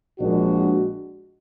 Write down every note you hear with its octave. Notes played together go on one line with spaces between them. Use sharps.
A#1 A#2 G#3 D4 F#4